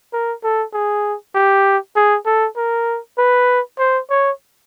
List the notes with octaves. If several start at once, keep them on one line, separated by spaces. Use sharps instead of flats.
A#4
A4
G#4
G4
G#4
A4
A#4
B4
C5
C#5